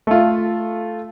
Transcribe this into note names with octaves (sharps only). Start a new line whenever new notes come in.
A3 F4